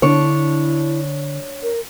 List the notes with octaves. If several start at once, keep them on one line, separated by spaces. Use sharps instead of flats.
D3 D4 E4 C#5
A#4